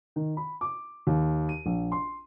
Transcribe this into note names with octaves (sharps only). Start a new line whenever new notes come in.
D#3
B5
D6
D#2
D#7
A#1
C6